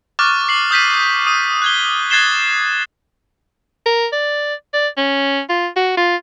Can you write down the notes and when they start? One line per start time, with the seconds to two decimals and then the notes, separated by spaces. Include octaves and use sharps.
0.19 C#6 D6 F6 F#6 A6
0.49 C7 F#7
0.71 D#6 G6 B6 D#7
1.27 D#6 D#7
1.62 F#6 G#6 G7
2.10 F#6 G#6 A6 C7 E7 G7
3.86 A#4
4.12 D5
4.73 D5
4.97 C#4
5.49 F4
5.76 F#4
5.97 F4